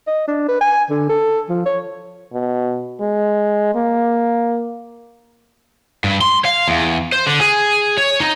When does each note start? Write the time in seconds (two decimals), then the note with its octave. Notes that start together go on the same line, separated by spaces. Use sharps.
0.07 D#5
0.28 D4
0.48 B4
0.61 G#5
0.90 D3
1.09 A4
1.49 F3
1.66 C#5
2.33 B2
3.01 G#3
3.75 A#3
6.04 G2
6.21 C6
6.45 F5
6.68 E2
7.12 C5
7.27 D3
7.41 G#4
7.98 C#5
8.20 D#4